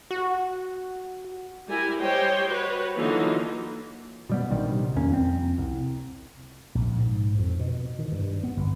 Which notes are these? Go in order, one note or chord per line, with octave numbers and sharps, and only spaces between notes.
F#4
G3 E4 A#4 G#5
G3 C5 C#5 D#5 G5 C6
F#4 B4 C#5
D3 E3 F#3 A#3 D#4 F4
B2 G3 B3
A#1 C3 D#3 G3
E2 A#3 C#4
F2 C4
C2
A#1
G#2
F2
B2
D#3
G2
B3
G1